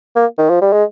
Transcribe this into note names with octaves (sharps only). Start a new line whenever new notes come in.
A#3
D#3
F3
G3
G#3